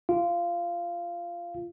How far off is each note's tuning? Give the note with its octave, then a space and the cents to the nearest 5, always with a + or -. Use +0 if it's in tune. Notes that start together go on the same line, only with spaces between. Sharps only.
F4 -15 F5 -15